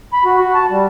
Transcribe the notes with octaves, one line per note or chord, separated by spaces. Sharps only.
B5
F#4
F#4
A5
G3